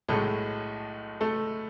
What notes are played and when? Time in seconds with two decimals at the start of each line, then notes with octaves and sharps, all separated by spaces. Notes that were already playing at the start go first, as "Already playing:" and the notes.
0.08 B1 A2 G#3 A3 A4
1.21 A3 A4